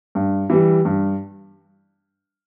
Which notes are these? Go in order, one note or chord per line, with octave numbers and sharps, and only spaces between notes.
G2
E3 G3
G2